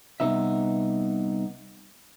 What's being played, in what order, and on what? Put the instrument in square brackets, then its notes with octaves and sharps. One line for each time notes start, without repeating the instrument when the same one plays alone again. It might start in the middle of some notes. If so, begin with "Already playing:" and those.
[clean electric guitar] C2 G2 C3 B3 D#4 E5